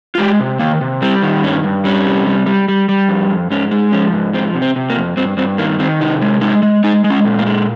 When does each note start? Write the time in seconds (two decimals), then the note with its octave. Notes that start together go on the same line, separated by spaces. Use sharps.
0.15 F4
0.18 G#3 G4
0.40 C3
0.59 D#3 A#3
0.81 C3
1.02 G3 C4
1.22 D#3
1.44 G2 C#4
1.63 G2
1.85 G3 C#4
2.06 C3
2.27 G3
2.46 G3
2.68 G3
2.89 G3
3.09 F2
3.30 F2
3.50 G#2 C#4
3.71 G#3
3.92 F3 C#4
4.13 G#2
4.33 F3 C4
4.55 C3
4.62 C4
4.76 C3
4.90 A#3
4.96 F2
5.17 G2 C4
5.37 G2 C4
5.58 D#3 A#3
5.79 D#3 C4
6.01 C3 D#4
6.21 G#3
6.41 G#3 D#4
6.63 G#3
6.84 G#3 D#4
7.04 G#3
7.10 C#4
7.25 A#2
7.39 A#3
7.46 G#3